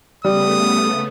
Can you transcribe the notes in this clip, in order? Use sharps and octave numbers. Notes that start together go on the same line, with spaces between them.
C#3 G3 A3 B3 D#6